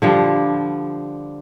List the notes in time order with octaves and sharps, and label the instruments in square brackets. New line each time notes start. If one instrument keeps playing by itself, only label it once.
[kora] D3 F3 G3